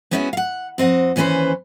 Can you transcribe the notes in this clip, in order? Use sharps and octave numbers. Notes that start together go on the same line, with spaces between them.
G#3 B3 C#4 D#4 E4 F#4
F5 F#5
F2 C4 D#5 F#5
D#2 E3 C#4 A4 B4 C5